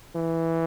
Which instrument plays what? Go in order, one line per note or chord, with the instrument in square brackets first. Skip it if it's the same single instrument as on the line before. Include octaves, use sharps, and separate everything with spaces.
[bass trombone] E3